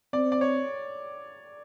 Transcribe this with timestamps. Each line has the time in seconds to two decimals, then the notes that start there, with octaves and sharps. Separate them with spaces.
0.13 C4 D5
0.32 D5
0.41 C#5